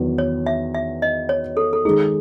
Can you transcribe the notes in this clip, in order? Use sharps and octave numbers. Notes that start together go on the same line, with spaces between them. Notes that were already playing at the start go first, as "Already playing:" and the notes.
Already playing: E2 D#3 F#3 B3
C#5
E5
E5
D#5
C#5
A4
A4
D#3 G#3 D#4 G#4